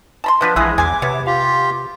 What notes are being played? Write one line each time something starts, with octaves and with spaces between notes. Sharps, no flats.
A5 B5 C6
F3 B3 D4 F4 B4 D#5
A#1 E3 G#3 E4 G#4 F#5
E2 G#4 G#5 D6
C3 B3 C#5 E5
F4 G4 F5